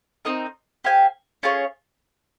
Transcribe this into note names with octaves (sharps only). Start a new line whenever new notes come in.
C4 D#4 A#4 D#5
G4 C5 F5 G#5
C#4 F4 G#4 C#5